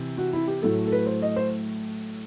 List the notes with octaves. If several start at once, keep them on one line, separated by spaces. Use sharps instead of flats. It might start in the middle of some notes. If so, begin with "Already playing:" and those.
Already playing: C3 E3
F#4
E4
G4
A2 F#3 A3 A4
A4
B4
C5
D#5
C5